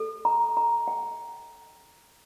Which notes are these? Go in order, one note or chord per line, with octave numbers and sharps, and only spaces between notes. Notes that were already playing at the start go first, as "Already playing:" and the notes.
Already playing: A4
A#5
A#5
G5